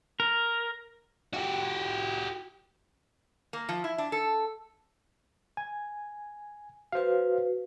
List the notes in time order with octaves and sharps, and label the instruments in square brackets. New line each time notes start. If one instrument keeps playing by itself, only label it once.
[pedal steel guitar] A#4
[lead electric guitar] F#4 G4
[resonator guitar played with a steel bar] A#3
F3
E4
D4
A4
[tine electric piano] G#5
[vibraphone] F#4 B4 [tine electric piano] C5 F5